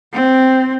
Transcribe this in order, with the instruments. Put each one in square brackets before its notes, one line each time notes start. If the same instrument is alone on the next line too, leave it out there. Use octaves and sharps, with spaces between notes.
[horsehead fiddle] C4